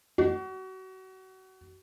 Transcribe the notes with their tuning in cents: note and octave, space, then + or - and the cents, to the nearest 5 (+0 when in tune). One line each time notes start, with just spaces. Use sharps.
F#4 +30